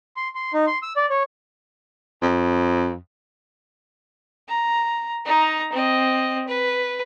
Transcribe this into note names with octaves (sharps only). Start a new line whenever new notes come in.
C6
C6
D#4
C6
E6
D5
C#5
F2
A#5
D#4 A#5
C4 D#5
B4